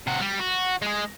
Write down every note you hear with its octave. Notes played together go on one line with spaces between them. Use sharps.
C3 F#4
G3
F#4
G#3 G#4